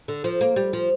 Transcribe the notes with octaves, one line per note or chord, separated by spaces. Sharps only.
D3
F3
A#3
G3
F3